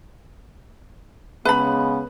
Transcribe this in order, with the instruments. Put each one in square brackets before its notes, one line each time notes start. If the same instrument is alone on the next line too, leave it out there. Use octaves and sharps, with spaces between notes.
[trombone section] C#3 G#3 [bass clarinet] B3 [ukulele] B4 B5